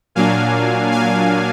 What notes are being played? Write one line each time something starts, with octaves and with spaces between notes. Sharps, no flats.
A#2 F#3 A#3 D4 F5 G#5
F5 G#5